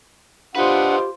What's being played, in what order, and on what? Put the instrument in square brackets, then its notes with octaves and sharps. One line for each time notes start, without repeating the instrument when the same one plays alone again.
[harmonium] D4 F#5 [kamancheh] F4 C5 [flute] G4 [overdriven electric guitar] B4 D#5